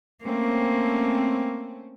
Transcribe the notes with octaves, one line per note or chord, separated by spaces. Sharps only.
A3 A#3 C4 C#4